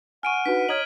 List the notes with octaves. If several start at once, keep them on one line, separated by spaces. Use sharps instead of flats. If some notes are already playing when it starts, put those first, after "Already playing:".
F#5 G#5 C#6 F6 D7 D#7
D4 D#4 F#4 B4 B6
C#5 D#5 A#5 D#6 F6 G#6 F#7